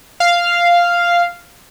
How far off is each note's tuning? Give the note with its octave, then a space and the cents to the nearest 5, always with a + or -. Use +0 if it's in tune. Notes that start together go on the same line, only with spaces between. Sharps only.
F5 -5